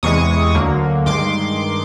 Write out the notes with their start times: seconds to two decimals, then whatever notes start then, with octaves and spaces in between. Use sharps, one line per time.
0.03 E2 C3 E3 G#3 C#6 D#6
0.55 D2 D3 F#3 A#3
1.06 G2 D#3 G#3 C6 D6